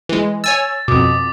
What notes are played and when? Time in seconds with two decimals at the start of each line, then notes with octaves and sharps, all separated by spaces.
0.09 E3 G#3
0.44 C#5 G#5 E6 A6
0.88 F2 B2 D6 D#6